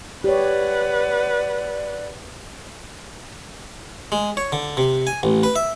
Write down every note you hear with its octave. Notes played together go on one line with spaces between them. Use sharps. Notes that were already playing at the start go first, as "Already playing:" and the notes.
G4 B4 C#5 D5 F#5
G#3
C#5
D3
C3
G#5
A1
B4
E5